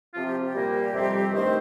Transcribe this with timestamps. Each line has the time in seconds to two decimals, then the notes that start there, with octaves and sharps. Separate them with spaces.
0.14 C3 F3 C4 F4
0.24 G4
0.44 G4
0.54 A#2 G3 A#3
0.94 F2 C3 G3 C4
1.33 G2 D#3 A3 C4 C5